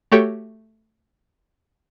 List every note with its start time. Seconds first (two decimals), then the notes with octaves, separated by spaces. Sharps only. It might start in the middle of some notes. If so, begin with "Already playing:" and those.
0.12 A3 F#4 G4 A4 C#5 G5